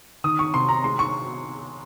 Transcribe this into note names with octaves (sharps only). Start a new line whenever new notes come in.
D#3 D#6
C#6
C3 C6
A#5
G#3 C6
C#6